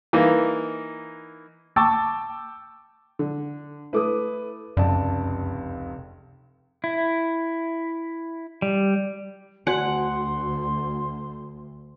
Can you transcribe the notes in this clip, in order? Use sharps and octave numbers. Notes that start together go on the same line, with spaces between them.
E3 A#3 D#4
G5 A5 C#6 D6 E6 A6
D3
A3 E4 B4 D6 D#6
F1 C#2 F#2 D5 A5
E4
G3
D2 F#4 D5 F#5 G#5 C6